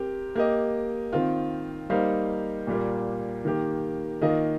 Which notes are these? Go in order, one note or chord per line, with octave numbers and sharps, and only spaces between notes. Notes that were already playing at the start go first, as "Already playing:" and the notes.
Already playing: C4 G4 A#4
A#3 G4 D#5
D#3 C4 F4
G3 A#3 D#4 C5 F5
A#2 G3 A#3
D#3 A#3 G4
D#3 A#3 F4 D#5